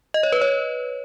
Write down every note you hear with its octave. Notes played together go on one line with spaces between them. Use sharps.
D#5
C#5
B4
C#5